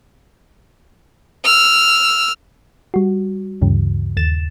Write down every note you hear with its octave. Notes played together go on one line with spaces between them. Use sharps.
E6 F6
G3 F#4
D2 G2 C#3 E3
D#2 A6 E7